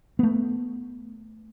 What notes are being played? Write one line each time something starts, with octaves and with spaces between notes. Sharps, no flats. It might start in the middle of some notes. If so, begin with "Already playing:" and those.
A3 B3